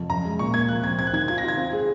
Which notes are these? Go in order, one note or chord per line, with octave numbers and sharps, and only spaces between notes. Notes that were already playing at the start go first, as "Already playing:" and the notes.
Already playing: F2
F#2 A#5
G#3
A#2 C#6
A#3 G#6
F3 F#6
C4 G#6
C4 G#6
F#6
D#3 G#6
F4 G#6
A#6
F4
G#6
C4
G#4